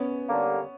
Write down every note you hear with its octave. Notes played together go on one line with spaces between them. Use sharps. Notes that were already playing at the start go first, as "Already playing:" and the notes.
Already playing: B3 C#4
D3 G3 A#3